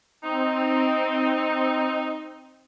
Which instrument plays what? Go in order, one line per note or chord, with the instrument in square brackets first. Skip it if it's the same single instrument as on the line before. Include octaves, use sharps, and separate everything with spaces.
[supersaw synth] C4 [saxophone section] D#4